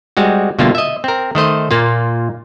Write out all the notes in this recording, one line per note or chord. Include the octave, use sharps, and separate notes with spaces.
G3 G#3 C4 F#4
B2 D3 G3 A3 A#3 F4
D#5 E5
C4 A#4
D#3 A3 C5 D#5
A#2 A#3 F4